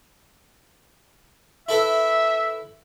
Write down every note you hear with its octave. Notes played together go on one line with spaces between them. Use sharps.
E4 A4 B4 E5